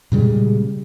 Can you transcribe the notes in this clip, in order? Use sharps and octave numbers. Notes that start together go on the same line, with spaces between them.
A#2 C#3 G3 G#3